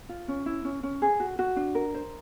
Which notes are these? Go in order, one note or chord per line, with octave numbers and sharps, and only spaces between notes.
F4
C#4
E4
C#4
C#4
G#4
F#4
F#4
D4
A#4
C5